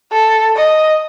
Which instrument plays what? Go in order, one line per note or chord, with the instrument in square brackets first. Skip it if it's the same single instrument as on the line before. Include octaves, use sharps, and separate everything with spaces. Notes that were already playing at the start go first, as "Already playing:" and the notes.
[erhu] A4
D#5